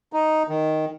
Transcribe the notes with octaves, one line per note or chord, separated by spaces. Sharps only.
D#4
D#3